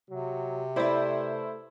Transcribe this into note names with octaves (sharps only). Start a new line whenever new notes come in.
C3 F#3
A3 E4 B4 C5 D5 E5